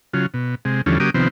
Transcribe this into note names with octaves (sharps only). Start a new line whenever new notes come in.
C#3 F#3 F4
B2
C3 G#3
E2 D3 F3 G3 C#4 A4
C#3 F#3 A#3 G4 D6 D#6
C3 D#3 F3 B3 C4